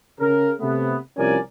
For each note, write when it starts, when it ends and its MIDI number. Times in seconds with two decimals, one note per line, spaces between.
0.20 0.51 49
0.20 0.51 70
0.60 0.96 48
0.60 0.96 57
0.60 0.96 59
1.17 1.37 36
1.17 1.37 53
1.17 1.37 61
1.17 1.37 70
1.17 1.37 74
1.17 1.37 80